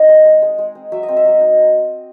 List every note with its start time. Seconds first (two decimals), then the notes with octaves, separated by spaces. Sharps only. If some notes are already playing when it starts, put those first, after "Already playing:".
Already playing: C4 D#4 D#5
0.09 G#3
0.26 G#3
0.42 G#3
0.58 G#3
0.75 C4
0.92 F#3 E5
1.03 D#5
1.08 C4
1.17 E5
1.25 F#3 D#5
1.41 D#4